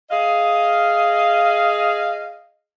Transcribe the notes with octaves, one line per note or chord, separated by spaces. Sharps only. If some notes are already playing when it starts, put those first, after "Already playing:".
G#4 D#5 F5